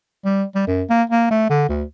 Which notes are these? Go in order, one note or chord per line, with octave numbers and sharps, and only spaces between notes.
G3
G3
F#2
A#3
A#3
A3
D3
D2